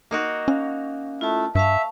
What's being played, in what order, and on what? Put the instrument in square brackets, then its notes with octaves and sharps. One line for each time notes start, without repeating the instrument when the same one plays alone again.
[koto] A#3 D#4 F#4
[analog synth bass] C#4 [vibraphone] F5
[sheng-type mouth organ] A3 E4 [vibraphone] F4 A5
[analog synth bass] G2 [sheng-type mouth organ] E5 [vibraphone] F5 A5 C#6